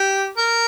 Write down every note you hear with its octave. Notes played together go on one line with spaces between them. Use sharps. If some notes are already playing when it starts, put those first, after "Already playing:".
Already playing: G4
A#4